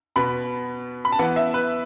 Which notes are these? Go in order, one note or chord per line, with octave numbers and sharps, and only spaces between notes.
B2 B3 B5
B5
A5
E3 B3 F#5
E5
B4